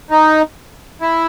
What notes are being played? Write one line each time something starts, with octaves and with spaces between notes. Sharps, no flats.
D#4
E4